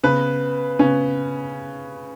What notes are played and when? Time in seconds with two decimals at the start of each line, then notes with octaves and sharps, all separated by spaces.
0.04 C#3 B3 B4
0.79 C#3 B3 C#4